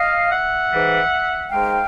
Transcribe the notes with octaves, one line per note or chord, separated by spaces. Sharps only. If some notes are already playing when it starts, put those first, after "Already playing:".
Already playing: D#5 F5
E5 F#5
G#2 E3 G3
G#2 D#3 G#3 F5 G5